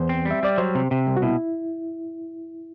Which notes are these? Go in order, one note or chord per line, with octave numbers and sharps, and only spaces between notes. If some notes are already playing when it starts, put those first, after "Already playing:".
Already playing: E2 C5
C4
G3
E5
G3 D5
F#3 C5
C3
C3
C2
F#4
B2 E4